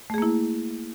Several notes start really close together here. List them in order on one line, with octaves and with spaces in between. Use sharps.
A3 G#4 A#3 E4